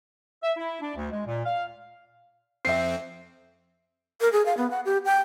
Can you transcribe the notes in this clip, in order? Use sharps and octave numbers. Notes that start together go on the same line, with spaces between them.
E5
E4
D4
D2
G#3
A#2
F5
F2 C4 E5 C7
A#4
G#4
F5
B3
F#5
G4
G5